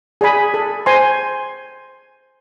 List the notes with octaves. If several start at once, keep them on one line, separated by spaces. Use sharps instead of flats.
G#4 D5 G#5 B5
A4
C5 G#5 C6